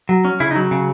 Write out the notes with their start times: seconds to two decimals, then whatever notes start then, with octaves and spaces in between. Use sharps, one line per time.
0.09 F#3
0.25 C#4
0.40 C#3 E4
0.51 D#4
0.56 F#3
0.71 C#3